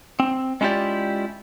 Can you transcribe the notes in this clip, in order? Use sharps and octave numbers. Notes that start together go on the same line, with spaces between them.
C4
G#3 C#4 E4 F4 G4 D5